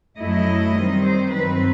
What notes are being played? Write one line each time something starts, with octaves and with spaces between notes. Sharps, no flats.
F#2 F#3 A3 E4 D#5
D#3 G3 C4
C5
G2 D#3 F#3 C4 B4